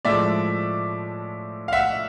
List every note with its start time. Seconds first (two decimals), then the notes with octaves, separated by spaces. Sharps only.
0.05 A2 F3 G#3 D5 E5
1.68 F5
1.72 E5 F#5